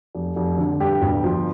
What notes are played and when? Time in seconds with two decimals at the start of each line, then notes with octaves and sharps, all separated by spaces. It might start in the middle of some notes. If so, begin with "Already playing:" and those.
0.15 F1
0.36 F1
0.58 D3
0.80 G2 G4
1.02 G1
1.24 F3